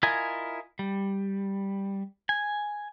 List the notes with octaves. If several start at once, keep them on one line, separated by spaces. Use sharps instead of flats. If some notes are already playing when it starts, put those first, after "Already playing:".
E4 F4 A#4 D#5 G#5
G3
G#5